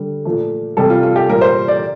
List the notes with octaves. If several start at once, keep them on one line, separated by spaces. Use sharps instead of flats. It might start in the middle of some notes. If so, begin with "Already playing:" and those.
Already playing: D3 G3
A#2 F3 A3
C3 G3 A4
F4
F4
G4
A#2 G3 A#4
C5
D5